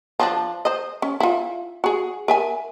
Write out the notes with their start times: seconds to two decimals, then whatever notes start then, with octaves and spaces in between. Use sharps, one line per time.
0.20 F3 C#4 D4
0.65 C5 D#5
1.02 C#4
1.20 E4 F4
1.84 F#4 G#4
2.28 A#4 E5 G#5